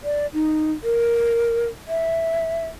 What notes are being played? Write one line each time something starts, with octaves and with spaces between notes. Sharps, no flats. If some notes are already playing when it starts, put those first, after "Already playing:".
D5
D#4
A#4
E5